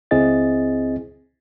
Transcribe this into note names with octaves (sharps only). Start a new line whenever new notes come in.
C#2 C4 E4 G#4 D#5 A6